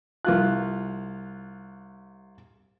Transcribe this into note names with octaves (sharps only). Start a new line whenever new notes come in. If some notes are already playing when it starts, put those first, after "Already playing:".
C2 F4 F#6